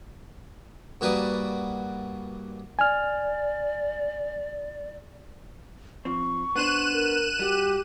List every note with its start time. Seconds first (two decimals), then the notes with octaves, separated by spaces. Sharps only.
1.01 G2 A#3 F#4 B4 D5 D#6
2.79 D5 G#5 F6
6.05 F3 C4 C#6
6.56 B3 D4 C5 F#6 D#7 E7
6.93 A#4
7.39 G3 F#4 G4